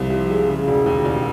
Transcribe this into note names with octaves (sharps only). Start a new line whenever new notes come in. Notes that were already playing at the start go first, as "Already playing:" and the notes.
Already playing: C2 C3 F3
F3
G#3
C#3
E1
D#2
E1